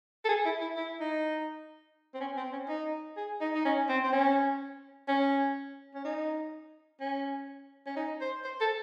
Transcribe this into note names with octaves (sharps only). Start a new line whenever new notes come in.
A4
G#4
E4
E4
E4
D#4
C4
C#4
C4
C#4
D#4
G#4
D#4
D#4
C#4
C4
C4
C#4
C#4
C#4
D#4
C#4
C#4
D#4
C5
C5
A4